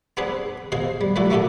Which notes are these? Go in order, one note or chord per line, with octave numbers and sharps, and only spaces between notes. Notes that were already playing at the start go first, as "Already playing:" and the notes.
B3 C4 D4 G#4 B4 C5
B2 G#4 C5 F5
G3
E3 F#3 A3 D4 F#4 A4
A3 A#3 C#4 F#4 G4 A4